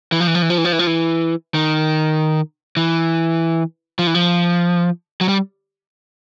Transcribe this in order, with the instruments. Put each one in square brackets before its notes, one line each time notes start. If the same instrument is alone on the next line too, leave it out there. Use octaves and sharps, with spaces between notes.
[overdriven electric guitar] E3
F3
E3
F3
E3
F3
E3
F3
E3
F3
E3
D#3
E3
F3
E3
F3
F#3
G3